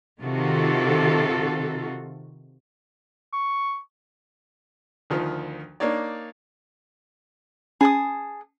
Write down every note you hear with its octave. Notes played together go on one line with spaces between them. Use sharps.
C3 D#3 F4 F#4 A4
C#6
D2 D#3 F3
A#3 D4 D#4 C#5 D5
C#4 G#4 A5 B5 D#6